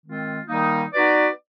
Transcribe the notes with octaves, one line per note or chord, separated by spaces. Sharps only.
D#3 G#3 C4 F4
D#3 G3 A#3 D#4
B3 D#4 F#4 B4 D5